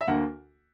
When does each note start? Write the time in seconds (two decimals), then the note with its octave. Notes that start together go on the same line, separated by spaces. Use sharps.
0.01 E5
0.07 D2 D3 A#3 F#5